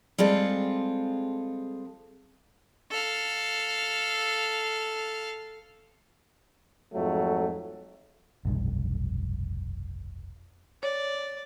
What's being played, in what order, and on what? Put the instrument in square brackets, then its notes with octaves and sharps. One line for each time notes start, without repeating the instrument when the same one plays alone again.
[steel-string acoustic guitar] G3 G#3 C4 F4 G#4 A4
[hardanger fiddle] A4 F5
[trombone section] F2 G#2 F#3 A3
[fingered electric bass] F1 B1 G2
[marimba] C#5 [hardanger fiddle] D5